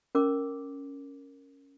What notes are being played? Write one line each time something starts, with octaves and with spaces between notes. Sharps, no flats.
C#4 A#4 D6